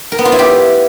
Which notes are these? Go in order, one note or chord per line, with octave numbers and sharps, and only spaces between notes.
A#4
B3
F4
E4
G4